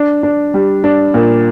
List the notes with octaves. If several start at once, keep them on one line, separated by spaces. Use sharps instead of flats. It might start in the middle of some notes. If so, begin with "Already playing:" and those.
Already playing: D4
D4
G3
D4
A#2